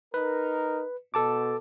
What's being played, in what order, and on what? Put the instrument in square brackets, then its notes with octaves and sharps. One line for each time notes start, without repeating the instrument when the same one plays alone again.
[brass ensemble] D#4 A#4 [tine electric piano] B4
[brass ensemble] B2 [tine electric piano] A4 A5 D6